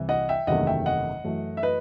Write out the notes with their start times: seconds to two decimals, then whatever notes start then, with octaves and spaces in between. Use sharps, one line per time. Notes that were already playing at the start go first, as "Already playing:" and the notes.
Already playing: C2 C3 E3 G3
0.09 D#5 F#5
0.29 E5 G5
0.47 F#1 E2 C3 D#3 A3 D#5 F#5
0.67 E5 G5
0.86 D#5 F#5
1.24 F#2 E3 A3
1.57 E5
1.63 B4 D#5